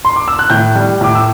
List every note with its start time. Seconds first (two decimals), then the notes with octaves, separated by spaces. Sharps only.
0.05 C6
0.16 D6
0.28 E6
0.39 F#6
0.50 A2 G6
0.75 G3
1.01 A2 D6
1.15 E6